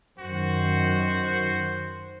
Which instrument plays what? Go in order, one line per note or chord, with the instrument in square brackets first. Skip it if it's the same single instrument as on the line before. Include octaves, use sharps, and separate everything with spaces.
[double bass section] F#2 D#3 [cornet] F#4 [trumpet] C5